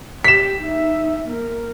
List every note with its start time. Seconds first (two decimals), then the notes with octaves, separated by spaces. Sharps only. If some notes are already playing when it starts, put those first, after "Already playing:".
0.24 G4 B6 E7
0.61 D#4 E5
1.26 A#3 A#4